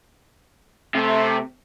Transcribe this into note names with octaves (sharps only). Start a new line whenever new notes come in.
C3 A3